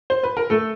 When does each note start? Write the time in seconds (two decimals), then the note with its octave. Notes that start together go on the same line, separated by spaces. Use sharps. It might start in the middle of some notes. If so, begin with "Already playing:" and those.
0.10 C5
0.23 B4
0.37 A#4
0.50 A3 A4